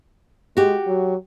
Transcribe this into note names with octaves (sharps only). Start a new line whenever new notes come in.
G#3 F#4 G4
F#3